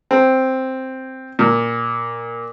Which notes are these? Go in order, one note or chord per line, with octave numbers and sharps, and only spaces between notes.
C4
A#2